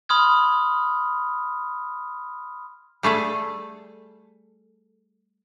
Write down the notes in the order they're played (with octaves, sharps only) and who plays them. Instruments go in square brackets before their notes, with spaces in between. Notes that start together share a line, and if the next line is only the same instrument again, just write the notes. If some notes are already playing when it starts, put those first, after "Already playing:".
[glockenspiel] B5 C6 D#6 F6 G#6
[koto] G3 A3 G#4 A4